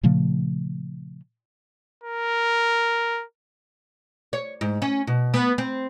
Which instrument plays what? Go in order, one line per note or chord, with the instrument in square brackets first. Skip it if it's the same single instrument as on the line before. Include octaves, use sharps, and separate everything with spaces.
[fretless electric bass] A#2 C#3 F3 A3
[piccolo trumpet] A#4
[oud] C#5
G#2
C#4
B2
B3
C4